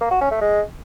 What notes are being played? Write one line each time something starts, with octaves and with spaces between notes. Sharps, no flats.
A#3
F#4
C#4
A3
G#3